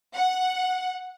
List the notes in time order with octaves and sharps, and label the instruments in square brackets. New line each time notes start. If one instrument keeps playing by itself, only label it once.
[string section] F#5